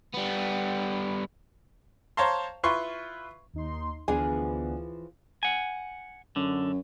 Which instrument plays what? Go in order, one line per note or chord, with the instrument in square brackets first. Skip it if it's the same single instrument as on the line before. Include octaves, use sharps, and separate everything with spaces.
[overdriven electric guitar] G3 B3
[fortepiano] C5 C#5 F5 A5 A#5 C6
E4 F4 B4 C6 C#6
[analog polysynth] D#2 D#4 C6
[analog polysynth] D2 B3 [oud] E3 F3 G#4 [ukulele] D4 G#5
[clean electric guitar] F#5 G#5
[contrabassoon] F#2 [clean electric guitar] D3